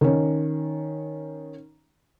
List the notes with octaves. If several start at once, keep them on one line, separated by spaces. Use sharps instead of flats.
D#3 C#4